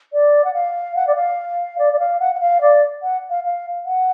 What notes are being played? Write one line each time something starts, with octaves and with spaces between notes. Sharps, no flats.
D5
F#5
F5
F#5
D5
F5
D5
D5
F5
F#5
F#5
F5
D5
F#5
F5
F5
F#5